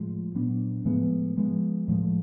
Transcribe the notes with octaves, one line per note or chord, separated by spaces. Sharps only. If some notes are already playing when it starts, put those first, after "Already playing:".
Already playing: A2 F3 G#3
A#2 F#3 B3 D4
A2 F3 G#3 B3
F3 G#3 B3
A2 F3 G#3